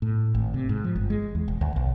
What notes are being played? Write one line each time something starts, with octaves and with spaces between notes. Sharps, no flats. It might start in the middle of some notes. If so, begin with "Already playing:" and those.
A2
G#1
C3
G#2
F3
G1
G#3
E2
E1
D2
B1